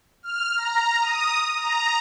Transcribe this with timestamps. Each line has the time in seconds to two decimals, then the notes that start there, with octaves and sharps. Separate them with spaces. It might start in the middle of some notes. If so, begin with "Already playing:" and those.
0.23 F6
0.57 A#5
1.01 D#6
1.59 A#5